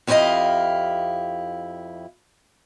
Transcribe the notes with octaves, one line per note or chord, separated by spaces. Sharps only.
F2 C#4 E4 G4 D#5 F5